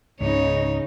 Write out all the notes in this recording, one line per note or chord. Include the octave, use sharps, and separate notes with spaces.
C#2 G#2 C#3 D#4 C#5